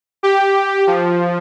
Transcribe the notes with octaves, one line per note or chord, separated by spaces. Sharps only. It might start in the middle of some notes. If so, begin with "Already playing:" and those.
G4
F3